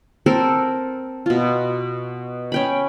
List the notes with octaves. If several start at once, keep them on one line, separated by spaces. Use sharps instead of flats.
C4 A4 A#4 C5
B2 F4
C#4 G5 B5